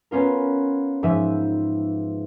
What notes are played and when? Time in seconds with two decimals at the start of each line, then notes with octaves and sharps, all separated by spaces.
0.11 B3 C#4 F4 A#4
1.03 G#2 F3 E5 D#7